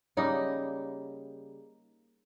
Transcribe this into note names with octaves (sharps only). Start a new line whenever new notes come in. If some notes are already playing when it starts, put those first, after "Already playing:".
C#3 G3 A#3 D#4